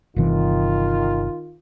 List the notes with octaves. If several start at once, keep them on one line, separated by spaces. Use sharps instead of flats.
G1 C3 D#3 E3 F4